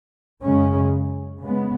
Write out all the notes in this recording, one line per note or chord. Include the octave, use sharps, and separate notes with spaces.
F#2 C#3 G#3 C#4
C#3 G#3 B3